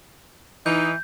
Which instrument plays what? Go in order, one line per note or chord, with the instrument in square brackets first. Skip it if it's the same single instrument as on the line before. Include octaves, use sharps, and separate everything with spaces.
[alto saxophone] E3 [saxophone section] D#4 [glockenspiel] G6